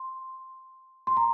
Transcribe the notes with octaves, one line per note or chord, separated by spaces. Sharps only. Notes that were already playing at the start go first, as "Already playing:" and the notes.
Already playing: C6
C6
A#5